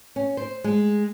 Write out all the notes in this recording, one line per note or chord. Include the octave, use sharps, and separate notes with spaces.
C#4
C5
G#3